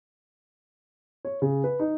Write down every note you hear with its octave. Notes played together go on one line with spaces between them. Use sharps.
C#5
C#3
B4
D#4